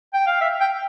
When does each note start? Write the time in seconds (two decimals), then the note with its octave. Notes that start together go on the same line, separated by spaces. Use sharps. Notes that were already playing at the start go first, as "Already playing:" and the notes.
0.13 G5
0.26 F5
0.41 E5
0.60 G5